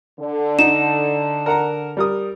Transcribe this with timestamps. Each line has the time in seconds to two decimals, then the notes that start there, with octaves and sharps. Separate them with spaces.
0.19 D3
0.59 D#4 E7
1.46 A#4 F#5 A#5
1.97 G3 A#4 D#6